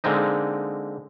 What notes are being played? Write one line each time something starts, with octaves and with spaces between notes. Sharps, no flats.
D3 G#3 A#3 C4 D#4